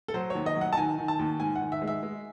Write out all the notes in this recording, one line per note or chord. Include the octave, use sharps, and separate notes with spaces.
A4
F#3 C5
D#2 C#5
D#5
F#3
F#5
A5
D#3 G#5
D#3
A5
D#2
G#2 G#5
F#5
D#3
E5
G#3
E5
G#3